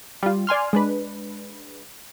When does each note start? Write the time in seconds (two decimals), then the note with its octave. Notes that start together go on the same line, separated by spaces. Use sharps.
0.23 G3 F4
0.47 D5 G#5 C6 F6
0.73 G#3 D4 B4